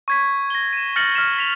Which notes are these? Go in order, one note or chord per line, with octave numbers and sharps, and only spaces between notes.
C#6 G#6 B6
A#6 G7
D#7 E7
F6 G6 A6 A#6 C#7 F#7
F6 B6 E7
B6 F7